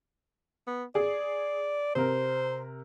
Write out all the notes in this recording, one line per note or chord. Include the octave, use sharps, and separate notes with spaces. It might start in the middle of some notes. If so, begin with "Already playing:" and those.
B3
G#4 D5
C3 A#4 C5